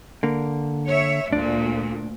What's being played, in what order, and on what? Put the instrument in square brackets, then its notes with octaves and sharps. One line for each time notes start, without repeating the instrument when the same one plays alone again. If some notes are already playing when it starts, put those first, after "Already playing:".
[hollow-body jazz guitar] D3 A#3
[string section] C#5 E5
[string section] D2 A#2 [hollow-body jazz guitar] D4